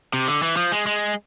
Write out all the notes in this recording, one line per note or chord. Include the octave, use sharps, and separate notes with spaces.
C3
D3
E3
F3
G#3
G#3